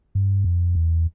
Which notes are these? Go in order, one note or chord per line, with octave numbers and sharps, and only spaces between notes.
G2
F2
E2